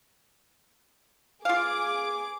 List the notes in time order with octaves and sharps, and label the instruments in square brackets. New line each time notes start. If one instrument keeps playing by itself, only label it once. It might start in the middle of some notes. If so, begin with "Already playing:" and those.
[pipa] F4 F5 [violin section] G#4 D6